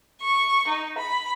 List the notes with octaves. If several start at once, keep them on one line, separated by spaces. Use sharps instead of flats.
C#6
D#4
B5